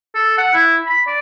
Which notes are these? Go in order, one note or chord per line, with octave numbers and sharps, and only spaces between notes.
A4
F#5
E4
B5
D5